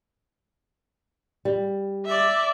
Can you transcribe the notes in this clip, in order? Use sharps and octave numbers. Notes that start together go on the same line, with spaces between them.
G3
D5 E5